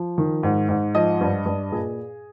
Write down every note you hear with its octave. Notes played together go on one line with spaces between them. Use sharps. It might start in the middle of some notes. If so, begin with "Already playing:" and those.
Already playing: F3
D#3
G#2
G#2
F3 D#5
G2
G2
A#2 G#4